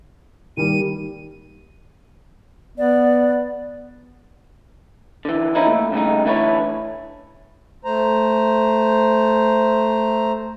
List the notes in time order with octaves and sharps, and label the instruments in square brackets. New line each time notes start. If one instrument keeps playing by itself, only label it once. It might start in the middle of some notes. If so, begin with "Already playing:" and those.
[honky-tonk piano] D#3 G3 A#3 [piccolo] D#7
[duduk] B3 [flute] D5
[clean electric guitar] D3 E3
F3 C#4 D#4 E4
A#2 A3
G2 C#3 A3 D#4
D3 E3 A3 F4 B4 C#5
[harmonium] A3 C5 A#5